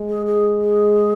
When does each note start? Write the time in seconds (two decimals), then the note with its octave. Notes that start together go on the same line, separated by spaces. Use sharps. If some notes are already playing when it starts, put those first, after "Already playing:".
Already playing: G#3
0.09 G#4
0.26 G#4
0.62 G#4